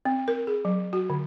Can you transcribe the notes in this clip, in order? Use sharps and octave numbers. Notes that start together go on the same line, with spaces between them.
C4
A#4
G#4
F#3
F#4
D3